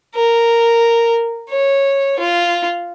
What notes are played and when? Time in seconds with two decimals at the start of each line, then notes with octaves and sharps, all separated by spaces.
0.15 A#4
1.49 C#5
2.19 F4